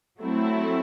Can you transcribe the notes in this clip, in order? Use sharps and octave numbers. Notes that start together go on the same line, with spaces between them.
F#3 A3 C4 E4